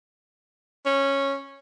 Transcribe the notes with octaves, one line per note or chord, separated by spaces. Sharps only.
C#4